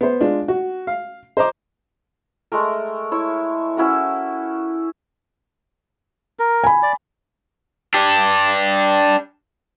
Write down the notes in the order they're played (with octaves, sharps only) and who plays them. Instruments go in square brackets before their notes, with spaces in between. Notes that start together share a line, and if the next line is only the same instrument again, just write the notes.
[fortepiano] B3 C5
G#3 D4 F4
F#4
F5
C5 D#5 A#5 D6
[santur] G#3 A3 A#4
E4 C#5
C#4 E4 F#4 A#4
[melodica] A#4
[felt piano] G#5 B5
[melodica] D5
[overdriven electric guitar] D4 G4